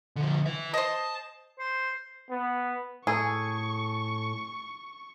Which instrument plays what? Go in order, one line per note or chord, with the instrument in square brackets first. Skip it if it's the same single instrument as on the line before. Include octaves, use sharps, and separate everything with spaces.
[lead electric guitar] D3 F3
B4 E5
[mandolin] C5 D#5 [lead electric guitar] A5
[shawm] C5
[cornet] B3
[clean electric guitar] A2 A4 [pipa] G#4 [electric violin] C#6